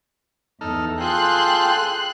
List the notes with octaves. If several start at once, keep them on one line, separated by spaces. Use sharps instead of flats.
E2 D#4 A4 F6
F4 G#4 A4 G5 C6 F#6